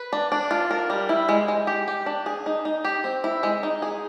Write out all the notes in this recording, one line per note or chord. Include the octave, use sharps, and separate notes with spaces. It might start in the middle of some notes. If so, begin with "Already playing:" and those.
Already playing: B4
D4
D4
F4
A#4
G3
E4
G#3
G#3
G4
G4
D4
G#4
D#4
D#4
G4
C4
E4
G#3
D#4
G#4